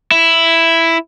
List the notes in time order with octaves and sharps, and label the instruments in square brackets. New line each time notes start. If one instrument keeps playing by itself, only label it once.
[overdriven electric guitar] E4